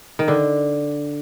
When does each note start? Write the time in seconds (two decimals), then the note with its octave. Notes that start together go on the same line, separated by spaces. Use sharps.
0.19 D#3
0.28 D3